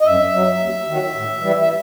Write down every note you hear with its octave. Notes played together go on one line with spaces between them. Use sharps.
D#5
F#2 E5
F#3
D#2
D#3 F#3
A2
E3 G3
E5